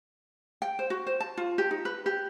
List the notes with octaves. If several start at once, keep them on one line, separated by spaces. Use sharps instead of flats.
G5
C5
F#4
C5
A5
F4
G4
D#4
B4
G4